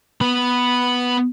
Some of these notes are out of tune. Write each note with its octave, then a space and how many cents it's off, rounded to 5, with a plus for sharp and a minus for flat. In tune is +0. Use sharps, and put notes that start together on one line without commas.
B3 +0 B5 +0